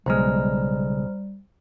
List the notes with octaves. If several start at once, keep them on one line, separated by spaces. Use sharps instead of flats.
B1 C#3 G3 G#3 C5 A#5 F6